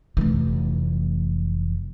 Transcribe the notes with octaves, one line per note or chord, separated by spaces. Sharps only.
F1 E3